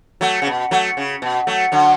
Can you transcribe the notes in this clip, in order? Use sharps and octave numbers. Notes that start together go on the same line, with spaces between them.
F#3 A3
C#3
B2
F#3 A3
C#3
B2
F#3 A3
D3 F#3